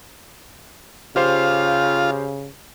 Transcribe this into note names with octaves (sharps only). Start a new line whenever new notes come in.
C#3 F4 G4 C5 F5